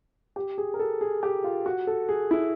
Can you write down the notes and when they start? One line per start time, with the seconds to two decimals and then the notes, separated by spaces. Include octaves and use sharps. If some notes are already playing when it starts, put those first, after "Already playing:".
0.36 G4
0.58 G#4
0.74 A#4
0.79 A4
1.01 G#4
1.23 G4
1.44 F4
1.66 F#4
1.87 A4
2.09 G#4
2.31 E4